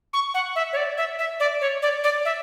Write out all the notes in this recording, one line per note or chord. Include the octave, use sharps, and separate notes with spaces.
C#6
F#5
E5
C#5
D5
E5
E5
D5
C#5
D5
D5
E5